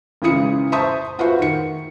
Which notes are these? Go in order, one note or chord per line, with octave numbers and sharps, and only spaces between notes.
G#1 C#3 E3 B5 D#6 C#7
C5 E5 A5 C6 C#6 D#6
F4 F#4 B4 C5 E5 C#6
D#3 C#7